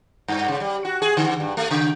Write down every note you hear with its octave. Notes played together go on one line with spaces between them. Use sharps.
G2
C#3
G3
F#4
G#4
D3
G2
A3
C#3